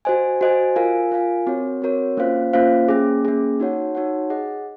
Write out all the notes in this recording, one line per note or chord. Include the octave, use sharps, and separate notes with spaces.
F#4 C5 D#5 G#5
F#4 C5 D#5 G#5
F4 A#4 F5 G#5
F4 A#4 F5 G#5
C4 F#4 A#4 C#5
C4 F#4 A#4 C#5
A#3 C#4 F4 C5 F5
A#3 C#4 F4 C5 F5
A#3 C#4 G#4
A#3 C#4 G#4
D#4 F#4 C#5 F#5
D#4 F#4 C#5 F#5
G#4 D#5 F#5